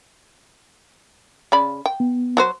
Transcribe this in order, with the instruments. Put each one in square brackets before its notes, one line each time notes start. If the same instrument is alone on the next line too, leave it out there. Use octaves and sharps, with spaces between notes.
[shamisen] C#3 D5 B5
G5
[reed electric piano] B3
[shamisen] F#3 F#4 C5